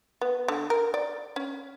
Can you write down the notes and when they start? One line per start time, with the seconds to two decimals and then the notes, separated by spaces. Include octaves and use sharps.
0.21 B3
0.48 D3
0.70 A#4
0.94 D5
1.36 C#4